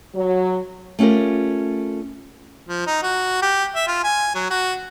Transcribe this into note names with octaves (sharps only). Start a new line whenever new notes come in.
F#3
A3 C#4 F4 G4 A#4
F3
D#4
F#4
G4
E5
F4
G#5
F#3
F#4